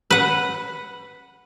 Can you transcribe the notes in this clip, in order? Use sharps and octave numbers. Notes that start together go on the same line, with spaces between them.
B4 F#5